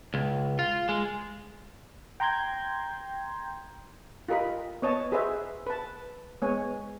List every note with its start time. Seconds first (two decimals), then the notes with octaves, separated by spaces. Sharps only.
0.14 C#2
0.59 F4
0.89 G#3
2.20 G5 A#5 C6 G6 G#6
4.29 F4 G4 A#4 D#5 B5
4.82 B3 C#5 D#5 A5
5.12 F#4 G#4 B4 C5 D#5 E5
5.67 B4 A5
6.42 G#3 B3 C#5 G#5